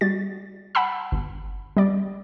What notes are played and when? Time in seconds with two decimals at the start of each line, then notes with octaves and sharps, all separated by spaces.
0.01 G3 F#4 A6
0.75 F#5 A5 B5 E6
1.12 G1
1.77 G3 D5